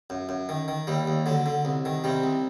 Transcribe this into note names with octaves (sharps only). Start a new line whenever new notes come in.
F#2
F#2
D#3
D#3
D#2 G3
D#2
D3 F#3
D3
C2
D#3
C3 G3
C2